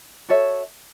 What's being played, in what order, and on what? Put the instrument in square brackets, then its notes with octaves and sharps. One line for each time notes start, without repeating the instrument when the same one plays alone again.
[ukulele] F#4 A4 C#5 E5